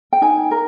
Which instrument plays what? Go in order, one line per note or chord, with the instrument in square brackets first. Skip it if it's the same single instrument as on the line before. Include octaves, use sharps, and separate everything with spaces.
[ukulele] G5
D#4 G#5
A#4